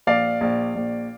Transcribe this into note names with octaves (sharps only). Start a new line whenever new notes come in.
A#1 D5 F5
A#1
A#1